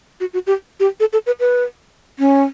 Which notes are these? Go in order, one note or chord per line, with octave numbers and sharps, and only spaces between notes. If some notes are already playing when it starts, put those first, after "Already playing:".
F#4
F#4
G4
G4
A4
A4
B4
B4
C#4